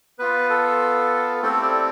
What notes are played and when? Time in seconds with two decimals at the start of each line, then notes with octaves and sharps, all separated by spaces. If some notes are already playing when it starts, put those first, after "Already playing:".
0.19 B3 F4 B4
0.49 A4
1.42 A3 C4 E4 G4 A4
1.63 D5